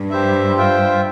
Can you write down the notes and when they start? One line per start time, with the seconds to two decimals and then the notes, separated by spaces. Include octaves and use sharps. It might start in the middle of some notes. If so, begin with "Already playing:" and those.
Already playing: G2
0.11 G4 C5 E5
0.57 F4 C5 E5 G5